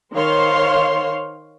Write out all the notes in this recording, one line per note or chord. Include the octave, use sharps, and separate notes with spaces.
D#3 C5 C#5 F5 C6